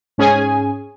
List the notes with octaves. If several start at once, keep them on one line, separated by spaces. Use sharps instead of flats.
G#2 C#4 G#4 G#5